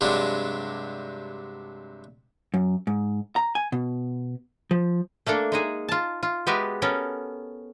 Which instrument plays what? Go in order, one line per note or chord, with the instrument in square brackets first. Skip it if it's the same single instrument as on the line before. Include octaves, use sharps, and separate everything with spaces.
[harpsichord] G2 C3 F#3 G#3 D4
[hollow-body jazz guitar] F#2
G#2
A#5
G#5
B2
F3
[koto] A3 A#3 D4 A4
G#3 D#4 G#4
F4 A5
F4
G#3 B3 F#4 G4 B4 E5
B3 C#4 A4 A#4